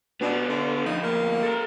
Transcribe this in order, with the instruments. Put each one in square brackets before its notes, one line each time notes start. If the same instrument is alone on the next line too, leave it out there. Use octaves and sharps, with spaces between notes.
[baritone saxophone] B2 [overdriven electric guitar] B3 D4
[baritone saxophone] D3
[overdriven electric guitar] D2 F3 [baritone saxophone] D#4
[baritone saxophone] A#3
[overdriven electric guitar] A4 A#5